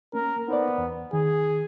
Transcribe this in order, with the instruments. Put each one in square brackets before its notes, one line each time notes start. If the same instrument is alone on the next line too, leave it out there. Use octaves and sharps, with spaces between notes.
[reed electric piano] A#3 C#4 [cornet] A#4
[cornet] B3 [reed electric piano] D#4 C5 D5
[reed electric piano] E2
[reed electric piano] D#3 [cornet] G#4